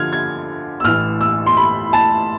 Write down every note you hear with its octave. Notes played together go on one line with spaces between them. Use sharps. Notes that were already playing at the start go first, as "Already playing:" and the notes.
Already playing: D3 F3 F6 G#6
G#6
E6
A1 A2 E3 F6
E6
C6
B5
A5